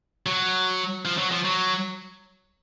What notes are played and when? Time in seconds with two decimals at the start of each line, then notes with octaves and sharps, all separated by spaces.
0.26 F#3
1.05 F3
1.18 F#3
1.31 F3
1.45 F#3